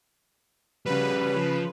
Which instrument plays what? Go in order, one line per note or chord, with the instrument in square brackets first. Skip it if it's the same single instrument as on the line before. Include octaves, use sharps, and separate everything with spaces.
[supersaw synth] C#3 B4 [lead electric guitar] G3 F#4
[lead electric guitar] F3